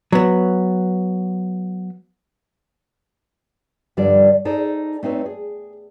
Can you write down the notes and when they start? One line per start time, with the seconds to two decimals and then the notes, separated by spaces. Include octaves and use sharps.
0.12 F#3 B3
3.97 G2 D3 F3 G3 D4 D5
4.45 D#4 G#4 A4 C5 D5
5.03 A3 C4 D#4 B4 C#5
5.26 G#4